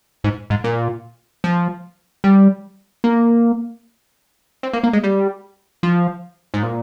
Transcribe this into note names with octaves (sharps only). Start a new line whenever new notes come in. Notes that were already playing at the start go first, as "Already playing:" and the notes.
G#2
G#2
A#2
F3
G3
A#3
C4
A#3
A#3
G#3
G3
F3
G#2
A#2